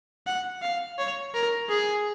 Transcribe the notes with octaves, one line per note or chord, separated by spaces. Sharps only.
F#5
F5
C#5
A#4
G#4